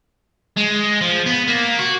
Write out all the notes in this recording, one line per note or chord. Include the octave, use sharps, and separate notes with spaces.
G#3
F3
B3
A#3
F#4